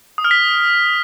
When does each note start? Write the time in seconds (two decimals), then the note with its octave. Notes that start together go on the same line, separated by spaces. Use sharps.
0.18 D#6
0.25 F6
0.31 B6